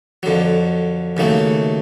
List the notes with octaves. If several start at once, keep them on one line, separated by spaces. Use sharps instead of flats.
F2 D3 F#3
D#2 C#3 F#3 A3